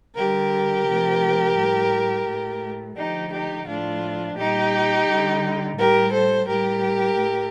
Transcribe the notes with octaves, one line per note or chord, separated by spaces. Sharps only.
D3 G3 G4 A#4
C3 F3 A3
A2 G3
A2 A3
D3 F3 A3 D#4 G4
D#4 G4
A2 F3 A3 D4 F4
A#2 G3 D#4 G4
D3 G3
A2 G3 G4 A#4
A4 C5
A2 G3 G4 A#4
A2 A3